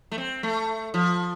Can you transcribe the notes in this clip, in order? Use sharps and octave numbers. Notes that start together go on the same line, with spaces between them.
A3
C4
A3
F3